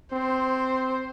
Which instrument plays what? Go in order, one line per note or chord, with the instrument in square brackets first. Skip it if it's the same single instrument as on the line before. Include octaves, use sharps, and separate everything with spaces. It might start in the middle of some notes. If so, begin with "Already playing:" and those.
[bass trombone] C4 [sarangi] C5